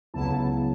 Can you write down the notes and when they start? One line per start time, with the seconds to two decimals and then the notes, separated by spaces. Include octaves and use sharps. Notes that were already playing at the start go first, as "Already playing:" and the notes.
0.14 C#2 C#3 F#3 B3 E4 A5